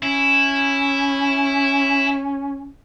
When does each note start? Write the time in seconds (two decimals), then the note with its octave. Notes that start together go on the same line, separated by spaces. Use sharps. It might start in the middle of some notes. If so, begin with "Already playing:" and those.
0.03 C#4 E4